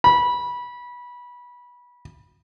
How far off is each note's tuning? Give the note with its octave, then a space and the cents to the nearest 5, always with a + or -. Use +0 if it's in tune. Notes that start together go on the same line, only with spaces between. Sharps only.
B5 -20